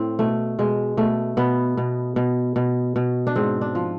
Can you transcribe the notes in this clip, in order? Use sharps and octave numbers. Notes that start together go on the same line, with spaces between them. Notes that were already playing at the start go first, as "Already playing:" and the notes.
Already playing: A2 C4
B2 A3
B2 G#3
B2 A3
B2 B3
B2
B2
B2
B2
D4
G#2 C4
D4
F3